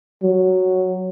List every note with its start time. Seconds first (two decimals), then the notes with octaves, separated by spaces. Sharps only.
0.23 F#3